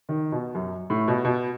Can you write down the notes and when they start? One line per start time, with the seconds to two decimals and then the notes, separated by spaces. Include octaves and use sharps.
0.09 D#3
0.32 B2
0.55 F#2
0.90 A2
1.08 B2
1.24 B2